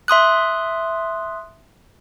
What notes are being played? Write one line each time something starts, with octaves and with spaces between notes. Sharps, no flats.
E5 C6 D#6 F#6